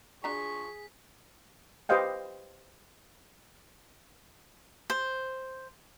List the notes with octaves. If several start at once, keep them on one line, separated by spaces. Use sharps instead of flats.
F3 D4 F#4 G#4 A#5 C#6 B6
G4 B4 C5 D#5 F5 G5
C5